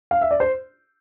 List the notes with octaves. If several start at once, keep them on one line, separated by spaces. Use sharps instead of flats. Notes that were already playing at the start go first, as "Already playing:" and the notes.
F5
E5
D5
C5